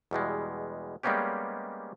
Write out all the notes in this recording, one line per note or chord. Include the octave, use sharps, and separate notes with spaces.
E2 B2 G3 G#3
G3 G#3 A#3 B3 C#4 G4